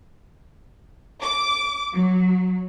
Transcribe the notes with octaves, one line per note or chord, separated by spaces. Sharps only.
D6
F#3